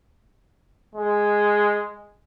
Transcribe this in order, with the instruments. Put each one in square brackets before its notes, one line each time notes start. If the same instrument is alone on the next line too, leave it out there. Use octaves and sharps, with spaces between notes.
[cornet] G#3